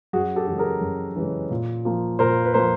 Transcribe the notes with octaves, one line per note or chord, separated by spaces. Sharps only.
F#2 F#4 G#4
G4 A4
C#3 E3 G#3
G#4 A#4
F#2
C#3 E3 G#3
A#2
F3 A#3
A#2 A#4 C5
B4
F3 A#3 A#4 C5